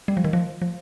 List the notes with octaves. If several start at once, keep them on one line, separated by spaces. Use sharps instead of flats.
G3
F3
D#3
F3
F3